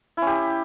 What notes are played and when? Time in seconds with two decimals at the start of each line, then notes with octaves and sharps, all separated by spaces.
0.17 E4
0.22 C#4
0.27 G4